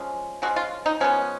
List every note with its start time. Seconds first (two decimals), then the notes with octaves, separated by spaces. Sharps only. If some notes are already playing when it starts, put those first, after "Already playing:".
Already playing: F3 G#3 C#4
0.42 F3 G#3 C#4 F#4
0.56 F4
0.86 D#4
1.00 F3 G#3 B3 C#4